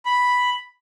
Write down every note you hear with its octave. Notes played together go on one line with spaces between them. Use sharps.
B5